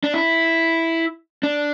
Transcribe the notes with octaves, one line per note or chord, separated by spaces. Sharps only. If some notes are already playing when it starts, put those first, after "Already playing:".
D4
E4
D4